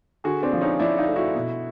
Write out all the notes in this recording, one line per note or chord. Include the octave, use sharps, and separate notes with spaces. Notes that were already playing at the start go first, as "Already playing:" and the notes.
D3 F#4 G#4
C4 D4
F3
C#4 D#4
F3 D4 E4
D#4 F4
A3
E4 F#4
B2